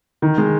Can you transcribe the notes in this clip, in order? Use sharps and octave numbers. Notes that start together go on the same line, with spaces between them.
D#3
G#3